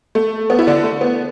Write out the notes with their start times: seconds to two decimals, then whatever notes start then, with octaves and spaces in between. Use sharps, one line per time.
0.15 A3
0.50 B3
0.59 E4
0.67 D3 D4
0.84 A3
1.01 B3